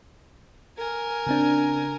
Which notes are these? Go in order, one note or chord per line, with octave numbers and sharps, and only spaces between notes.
A#4 G#5
C#3 C4 D4